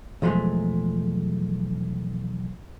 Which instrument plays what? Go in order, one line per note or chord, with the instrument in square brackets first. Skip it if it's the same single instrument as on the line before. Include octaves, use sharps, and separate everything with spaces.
[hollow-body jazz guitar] B1 E2 F3 F#3 G#3 A3